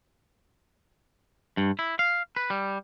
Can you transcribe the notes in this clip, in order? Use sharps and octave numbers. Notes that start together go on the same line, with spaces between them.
G2
E4
F5
B4
G3